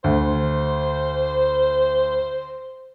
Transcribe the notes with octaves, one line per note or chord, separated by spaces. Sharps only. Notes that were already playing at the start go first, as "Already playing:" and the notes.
D2 C5